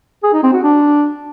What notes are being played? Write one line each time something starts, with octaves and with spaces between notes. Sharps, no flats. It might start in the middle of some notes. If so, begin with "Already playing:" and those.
G#4
D#4
C4
F#4
D4